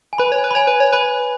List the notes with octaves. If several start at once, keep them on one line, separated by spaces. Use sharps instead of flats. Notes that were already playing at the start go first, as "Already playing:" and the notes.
G#5
B4 B5
C#5
G#5
B4
B5
C#5 G#5
B4
C#5
B4 B5